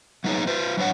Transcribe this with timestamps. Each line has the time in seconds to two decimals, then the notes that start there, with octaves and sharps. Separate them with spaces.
0.24 F#3 A#3 B3 D#4 G#4 C#5
0.47 F4 B4 C5
0.77 F#3 D4 C5 C#5 F#5